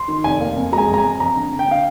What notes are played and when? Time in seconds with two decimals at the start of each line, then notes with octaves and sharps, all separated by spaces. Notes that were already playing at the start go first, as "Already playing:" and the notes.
Already playing: C6
0.08 D#3
0.24 F1 G#5
0.40 A#3
0.57 F2
0.72 G#3 A#5
0.78 G#5
0.87 F2
0.94 A#5
0.98 G#5
1.04 F2
1.20 F2 A#5
1.36 D3
1.51 D3
1.59 G5
1.67 D3 F5